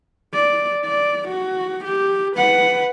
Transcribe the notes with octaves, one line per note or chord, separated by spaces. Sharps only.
D5
D5
F#4
G4
B4 F#5